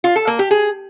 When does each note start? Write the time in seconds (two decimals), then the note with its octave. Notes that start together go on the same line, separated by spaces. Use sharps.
0.04 F4
0.16 A4
0.27 A#3
0.39 G4
0.51 G#4